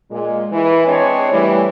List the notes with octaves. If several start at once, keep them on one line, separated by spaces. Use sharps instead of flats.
A#2 G#3
E3
G#3 C4 D4 G#4 C#5
E3 G3 A3